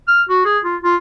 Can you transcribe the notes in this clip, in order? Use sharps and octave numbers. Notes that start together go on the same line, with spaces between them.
F6
F#4
G#4
F4
F4